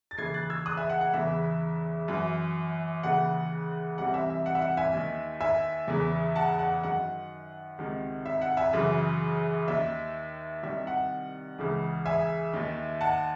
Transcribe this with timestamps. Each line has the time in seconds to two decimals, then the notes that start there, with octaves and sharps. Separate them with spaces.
0.11 A6
0.18 D#2 C#3 E3 G#6 C7
0.34 F#6 A6
0.50 E6 G#6
0.66 D#6 F#6
0.77 E5 G#5
0.89 F#5
1.01 F#5
1.13 E2 C#3 E3 E5
2.08 F#2 E3
3.03 D#2 C#3 E3 F#5
3.98 C2 C3 E3 F#5
4.14 E5 G#5
4.30 E5
4.46 F#5
4.55 E5
4.61 F#5
4.77 E5 G#5
4.93 D#2 D#3
5.41 E5 G#5
5.88 E2 C#3 E3
6.36 F#5 A5
6.59 F#5
6.83 F#2 D#3 F#5
7.78 C#2 C3 D#3
8.26 E5
8.42 F#5
8.57 E5 G#5
8.73 F#2 C#3 E3
9.68 D#2 D#3 E5
10.63 C2 C3 D#3 E5
10.87 F#5
11.58 C#2 C#3 E3
12.06 E5 G#5
12.53 D#2 D#3
13.01 F#5 A5